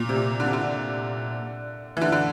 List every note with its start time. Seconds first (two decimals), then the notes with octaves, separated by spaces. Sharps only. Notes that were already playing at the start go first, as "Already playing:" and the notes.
Already playing: A#2
0.09 C3
0.16 A#2
0.40 D3
0.46 C3
0.53 D3
1.97 E3
2.01 D3
2.12 D3